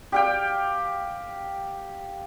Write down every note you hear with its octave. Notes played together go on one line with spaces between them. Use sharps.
G4 F5 G5